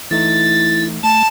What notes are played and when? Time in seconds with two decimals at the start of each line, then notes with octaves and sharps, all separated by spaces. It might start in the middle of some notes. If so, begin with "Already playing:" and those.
0.11 E3 A3 D#4 E4 A6
1.03 A3 A5